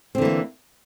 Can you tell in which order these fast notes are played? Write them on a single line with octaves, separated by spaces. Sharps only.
C4 D3 E3 A#3